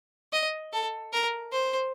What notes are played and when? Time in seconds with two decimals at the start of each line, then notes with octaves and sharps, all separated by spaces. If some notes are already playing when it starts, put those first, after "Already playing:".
0.33 D#5
0.72 A4
1.13 A#4
1.52 C5